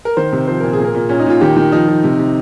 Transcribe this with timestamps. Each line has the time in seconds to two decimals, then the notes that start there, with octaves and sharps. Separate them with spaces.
0.05 A#4
0.17 D#3 C5
0.32 C3
0.47 F3 C5
0.60 A#2 A#4
0.73 G#4
0.79 A#2
0.85 A#4
0.95 A#2
1.09 A#2 C#4
1.19 D#4
1.26 A#2 F4
1.41 D#3 G4
1.57 D#3
1.72 F3 D#4
1.88 F3
2.04 C3
2.19 C3